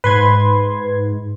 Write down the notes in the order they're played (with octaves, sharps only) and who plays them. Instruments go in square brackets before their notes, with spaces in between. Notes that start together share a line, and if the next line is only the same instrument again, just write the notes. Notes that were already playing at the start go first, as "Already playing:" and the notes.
[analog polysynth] G#2 [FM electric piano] B4 C6 G#6